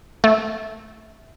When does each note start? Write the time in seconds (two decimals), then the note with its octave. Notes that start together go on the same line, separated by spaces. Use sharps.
0.24 A3